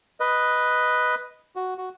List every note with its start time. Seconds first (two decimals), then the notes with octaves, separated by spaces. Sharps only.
0.20 B4 D#5
1.56 F#4
1.78 F#4